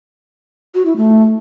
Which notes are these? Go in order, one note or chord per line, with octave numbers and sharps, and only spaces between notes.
F#4
E4
A3